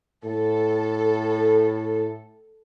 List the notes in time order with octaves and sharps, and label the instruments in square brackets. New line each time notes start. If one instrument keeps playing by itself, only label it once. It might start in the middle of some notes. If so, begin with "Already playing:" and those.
[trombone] A2 [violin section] A4